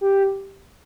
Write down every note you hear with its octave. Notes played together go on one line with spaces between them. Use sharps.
G4